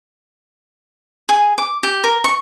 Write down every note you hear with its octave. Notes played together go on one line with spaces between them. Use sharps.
G#4
D6
G4
A#4
C#6